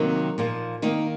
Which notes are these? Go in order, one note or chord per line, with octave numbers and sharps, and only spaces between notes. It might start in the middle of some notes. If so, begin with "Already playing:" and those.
Already playing: C3 D#3 F#3 A#3 D#4
A#2 F3 A#3
D#3 A#3 D#4